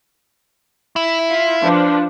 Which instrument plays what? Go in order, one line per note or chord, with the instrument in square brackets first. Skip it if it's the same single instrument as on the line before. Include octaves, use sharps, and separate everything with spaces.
[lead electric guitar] E4
[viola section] F4
F3 D4 B4